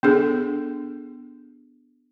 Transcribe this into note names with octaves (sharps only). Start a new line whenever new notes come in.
B3 D4 G#4 A4